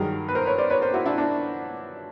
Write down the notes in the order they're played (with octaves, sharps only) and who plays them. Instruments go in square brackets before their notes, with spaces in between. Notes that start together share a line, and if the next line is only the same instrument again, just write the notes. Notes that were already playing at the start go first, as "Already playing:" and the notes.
Already playing: [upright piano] G2 D#3 F#3 G#4 A#4
B4
A#4 C5
B4 C#5
C5 D5
B4 C#5
A#4 C5
E4 F#4
D4 E4
D4